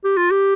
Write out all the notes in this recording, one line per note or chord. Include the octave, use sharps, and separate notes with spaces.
G4
F4
G4